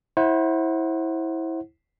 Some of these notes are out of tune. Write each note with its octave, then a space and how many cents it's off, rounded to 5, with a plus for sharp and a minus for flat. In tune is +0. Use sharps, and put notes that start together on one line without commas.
E4 -15 C5 +25 F#5 +0